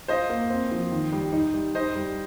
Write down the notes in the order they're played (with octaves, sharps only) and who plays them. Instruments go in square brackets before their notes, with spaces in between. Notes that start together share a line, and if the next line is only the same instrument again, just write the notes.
[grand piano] F4 [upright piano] C5 D#5
[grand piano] A#3
C4
F3
D#3
G3
D#4
G3
[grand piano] D#4 [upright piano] C5 D#5
[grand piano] G3